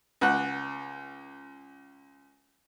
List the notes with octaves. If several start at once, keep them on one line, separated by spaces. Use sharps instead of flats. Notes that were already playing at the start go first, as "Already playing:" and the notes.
C#2 F#5